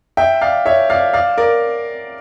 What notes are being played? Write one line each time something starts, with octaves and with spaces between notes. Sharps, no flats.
E5 G5
D5 F5
C#5 E5
D5 F5
D5 F5
A#4 D5